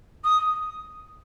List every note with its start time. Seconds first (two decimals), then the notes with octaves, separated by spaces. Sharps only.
0.25 D#6